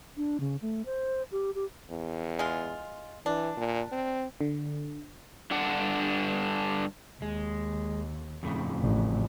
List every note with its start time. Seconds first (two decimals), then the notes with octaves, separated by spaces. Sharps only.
0.17 D4
0.40 C#3
0.62 A3
0.85 C5
1.32 G4
1.55 G4
1.91 E2
2.39 G#3 F4
3.26 E3 D4
3.57 A#2
3.92 C4
4.41 D3
5.51 G2 D3 D4 F#5
7.22 D#2 G#3
8.43 F2 A2 C#3
8.80 A1